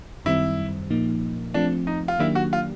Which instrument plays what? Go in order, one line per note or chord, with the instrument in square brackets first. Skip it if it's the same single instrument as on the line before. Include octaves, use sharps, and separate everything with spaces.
[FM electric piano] F#2 D#3 G3 C4 [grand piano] E4
[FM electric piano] A#2 F3 A#3 D#4
[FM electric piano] F3 A3 C4 F4 [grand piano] D4
[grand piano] D#4
F4
[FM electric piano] D#3 F#3 A#3 D4 G4 [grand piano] E4
[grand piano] F#4
F4